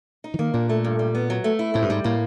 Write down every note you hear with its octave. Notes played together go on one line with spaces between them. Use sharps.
D#4
E3
D#3 A#3
A#2 D4
A3
G2
G3
B3
F#3
A3
E4
A2 C4
G2
G#2 G3
A2 A#3